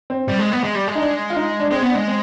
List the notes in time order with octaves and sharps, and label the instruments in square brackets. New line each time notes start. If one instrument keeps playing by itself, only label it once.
[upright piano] C4
[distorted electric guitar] G3
G#3
B3
G#3
G3
G#3
[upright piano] D#4
D4
F4
D#4
D4
[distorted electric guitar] G#3 [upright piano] C4
[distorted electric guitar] B3
[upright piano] D4
[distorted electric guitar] G#3
[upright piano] C4